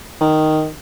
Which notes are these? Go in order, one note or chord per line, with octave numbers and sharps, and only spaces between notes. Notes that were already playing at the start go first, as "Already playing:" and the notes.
D#3